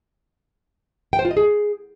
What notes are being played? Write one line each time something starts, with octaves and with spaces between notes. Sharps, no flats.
G5
C5
F4
D#5
G#4